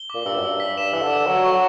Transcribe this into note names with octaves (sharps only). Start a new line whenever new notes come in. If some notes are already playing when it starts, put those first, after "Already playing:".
Already playing: G7
A#2 D6
G2 E6
F#2
G2 E6
B6
G2 E7
E3 E6
D3
E6
F#3 E6
C#6
F#3